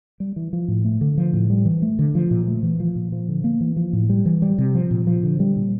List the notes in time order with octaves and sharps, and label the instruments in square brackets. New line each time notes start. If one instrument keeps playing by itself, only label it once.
[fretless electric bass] G3
E3
F3
A2
A3
D3
F3
A2
G3
E3
A3
D3
F3
A#2
A3
E3
F3
A#2
F3
D3
A#3
E3
F3
A2
G3
E3
G3
C3
F3
A#2
F3
D3
G3
A#2